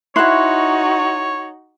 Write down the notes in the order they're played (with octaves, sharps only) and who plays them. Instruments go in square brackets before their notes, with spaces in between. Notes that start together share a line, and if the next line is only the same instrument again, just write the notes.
[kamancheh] D#4 F#4 [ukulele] E4 E5 [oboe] C#5 [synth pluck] C6 F#6